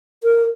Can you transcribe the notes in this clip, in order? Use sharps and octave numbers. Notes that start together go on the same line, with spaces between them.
A#4